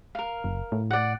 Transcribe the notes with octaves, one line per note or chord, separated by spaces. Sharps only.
A#4 F5
F#1
A2
D5 F#5